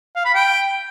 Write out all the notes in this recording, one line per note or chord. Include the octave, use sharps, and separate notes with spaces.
F5
B5
G5